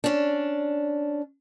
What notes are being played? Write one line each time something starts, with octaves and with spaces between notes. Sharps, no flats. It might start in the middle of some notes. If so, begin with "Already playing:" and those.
C#4 D4